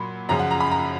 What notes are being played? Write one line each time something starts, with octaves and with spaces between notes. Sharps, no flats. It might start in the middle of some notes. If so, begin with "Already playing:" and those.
Already playing: A#2 F#3 B5
F#2 C#3 F3 A#5
F#5
A#5
B5
A#5